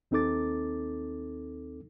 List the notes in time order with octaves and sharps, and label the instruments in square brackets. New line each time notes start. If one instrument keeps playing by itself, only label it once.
[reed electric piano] D#2 C4 D#4 A4 D6 A6